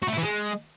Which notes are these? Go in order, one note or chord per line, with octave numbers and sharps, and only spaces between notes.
F#4
A3
E4
E3
G#3